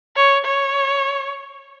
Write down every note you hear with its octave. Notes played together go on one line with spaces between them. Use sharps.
C#5
C#5